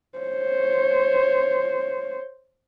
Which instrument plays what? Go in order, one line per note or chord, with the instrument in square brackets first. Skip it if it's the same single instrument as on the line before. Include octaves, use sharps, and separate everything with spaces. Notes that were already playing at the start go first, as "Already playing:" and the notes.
[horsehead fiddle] C5 C#5